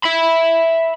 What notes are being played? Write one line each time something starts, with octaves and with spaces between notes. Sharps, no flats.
E5 B5